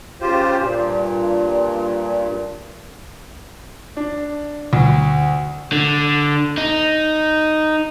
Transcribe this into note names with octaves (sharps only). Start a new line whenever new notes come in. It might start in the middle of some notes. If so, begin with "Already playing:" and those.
C#3 F4 G4 C5
G2 A#2
D4
D2
D3
D#4